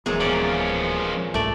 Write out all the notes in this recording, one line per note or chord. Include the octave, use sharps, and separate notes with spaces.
D1 A#2 E3 F#3 G#3 B3 G#4
F3 C#4 D5
C2 G#2 A3 D5